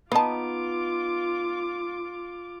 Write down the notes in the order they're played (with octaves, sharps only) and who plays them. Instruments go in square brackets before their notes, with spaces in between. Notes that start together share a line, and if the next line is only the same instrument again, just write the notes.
[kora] B3 D#4 [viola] F4 D6 [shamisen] F5 A5